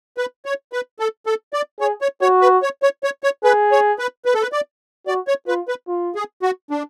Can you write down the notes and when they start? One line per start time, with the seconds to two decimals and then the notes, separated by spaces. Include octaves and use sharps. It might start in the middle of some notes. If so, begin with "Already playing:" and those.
0.18 B4
0.46 C#5
0.73 B4
1.00 A4
1.26 A4
1.53 D5
1.80 G#4 C#5
2.01 C#5
2.22 F#4 C#5
2.42 B4
2.63 C#5
2.83 C#5
3.04 C#5
3.24 C#5
3.44 G#4 B4
3.72 C#5
3.99 B4
4.25 B4
4.34 A4
4.42 B4
4.52 D5
5.07 F#4 D5
5.28 C#5
5.48 F4 B4
5.68 B4
5.88 F4
6.15 G#4
6.43 F#4
6.71 D4